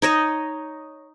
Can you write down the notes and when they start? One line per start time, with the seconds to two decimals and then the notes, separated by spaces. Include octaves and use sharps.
0.02 D#4 C#5 D#5